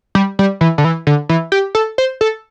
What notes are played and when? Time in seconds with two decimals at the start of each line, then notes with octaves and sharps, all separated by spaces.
0.15 G3
0.39 G3
0.61 E3
0.78 D3
0.84 E3
1.07 D3
1.29 E3
1.52 G4
1.75 A4
1.98 C5
2.21 A4